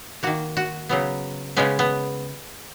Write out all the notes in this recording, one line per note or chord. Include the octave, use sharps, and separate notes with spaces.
D#3 A#3 F#4
F#4
C#3 F#3 B3
C#3 G#3 B3 C#4
B3